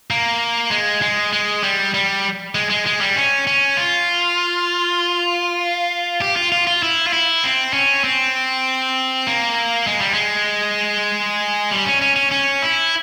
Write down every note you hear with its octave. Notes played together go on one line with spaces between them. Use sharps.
A#3
G#3
G#3
G#3
G3
G3
G#3
G#3
G#3
G3
C#4
C#4
F4
G4
F4
F4
F4
E4
F4
E4
C4
C#4
C4
A#3
G#3
G3
G#3
G3
C#4
C#4
C#4
C#4
E4